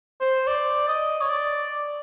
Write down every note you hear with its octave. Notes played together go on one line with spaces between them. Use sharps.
C5
D5
D#5
C#5
D5